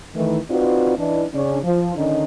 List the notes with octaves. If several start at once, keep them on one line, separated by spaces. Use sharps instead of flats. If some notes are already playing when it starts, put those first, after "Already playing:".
D#3 E3 A3
C4 D#4 F4 F#4 B4 D5
E3 D4 D#4
C#3 C#4 D4
F3
D3 D#3 C#4 D#4